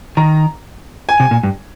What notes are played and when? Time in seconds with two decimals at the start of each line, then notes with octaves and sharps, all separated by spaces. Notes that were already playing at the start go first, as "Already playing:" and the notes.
0.17 D#3 A#5
1.09 G#5
1.20 C3
1.31 A#2
1.43 G2